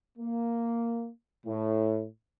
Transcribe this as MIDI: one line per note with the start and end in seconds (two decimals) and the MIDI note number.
0.18 1.10 58
1.47 2.06 45